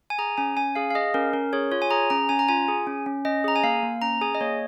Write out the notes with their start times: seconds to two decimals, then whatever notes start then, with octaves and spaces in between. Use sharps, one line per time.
0.10 G#5
0.18 G#4 A#5
0.37 C#4 G#5
0.57 C#4 G#5
0.75 G#4 F5
0.91 F5
0.95 G#4 D#5
1.14 C#4 A#4
1.33 C#4 A#4
1.53 G#4 C#5
1.72 F4 C#5
1.82 G#5
1.91 G#4 A#5
2.10 C#4 A#5
2.29 C#4 G#5
2.39 A#5
2.48 F4 G#5
2.68 G#4
2.87 C#4
3.06 C#4
3.25 C#4 D#5
3.44 G#4 A#5
3.56 G#5
3.63 A#3 F5
3.83 A#3
4.02 C#4 A#5
4.21 G#4 G#5
4.35 D#5
4.41 A#3 C#5